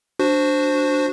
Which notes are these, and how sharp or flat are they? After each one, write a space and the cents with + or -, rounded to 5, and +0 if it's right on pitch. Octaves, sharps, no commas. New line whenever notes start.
D4 +0 F#4 -5 C5 +0